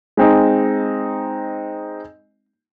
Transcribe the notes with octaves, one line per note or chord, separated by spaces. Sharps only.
G#3 C4 D#4